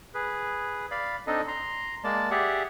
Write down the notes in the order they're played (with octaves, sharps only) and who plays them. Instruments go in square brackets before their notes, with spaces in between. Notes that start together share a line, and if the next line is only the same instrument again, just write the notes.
[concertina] G#4 B4
D5 F5 B5
C4 D4 D#4 A4 D#5
A#5 C6
G#3 A#3 D5 A5
G4 G#4 D5 E5 F#5